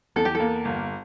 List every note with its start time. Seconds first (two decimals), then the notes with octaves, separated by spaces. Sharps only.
0.16 E2 A4
0.25 G4
0.35 A4
0.40 A#3
0.65 G1